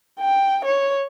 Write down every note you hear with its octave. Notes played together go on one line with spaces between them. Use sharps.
G5
C#5